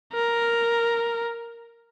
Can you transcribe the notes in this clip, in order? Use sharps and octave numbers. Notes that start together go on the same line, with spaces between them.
A#4